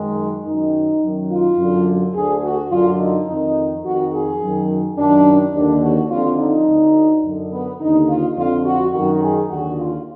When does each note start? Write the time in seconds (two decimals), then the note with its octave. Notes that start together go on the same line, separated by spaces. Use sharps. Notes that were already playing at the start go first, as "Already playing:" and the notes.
Already playing: F#2 D#3 G#3
0.45 F#2 D#3 D#4
1.02 F#2 D#3
1.30 F4
1.58 F#2 D3
2.14 D2 D3 G#4
2.43 F#4
2.72 F#2 D3 F4
2.99 D#4
3.28 F2 D#3 D#4
3.85 F2 D#3 F#4
4.13 G#4
4.42 F#2 D#3
4.97 F#2 D#3 D4
5.54 D#2 D3 D4
5.82 F#4
6.10 F2 D3 F4
6.39 D#4
6.67 D2 D3
7.24 F#2 D3
7.52 B3
7.80 D#2 D3 D#4
8.09 F4
8.36 F2 D3 F4
8.66 F#4
8.94 F#2 D#3 F#4
9.22 G#4
9.50 D#2 D3 F#4
9.78 F4